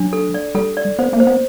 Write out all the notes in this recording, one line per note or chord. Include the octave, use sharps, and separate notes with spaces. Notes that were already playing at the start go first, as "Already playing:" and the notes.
Already playing: F#3 D4
A4
D5
G3 A4
D5
B3 C5
A#3
C5
B3